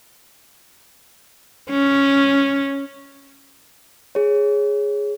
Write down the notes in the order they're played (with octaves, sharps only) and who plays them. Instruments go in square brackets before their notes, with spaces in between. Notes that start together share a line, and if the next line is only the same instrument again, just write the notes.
[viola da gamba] C#4
[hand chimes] G#4 C#5